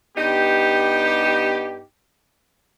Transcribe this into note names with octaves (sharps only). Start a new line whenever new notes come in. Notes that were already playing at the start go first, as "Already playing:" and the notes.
G2 B3 D#4 G4